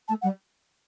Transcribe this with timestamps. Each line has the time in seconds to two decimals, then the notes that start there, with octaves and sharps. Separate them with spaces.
0.08 A3 A5
0.22 G3 F#5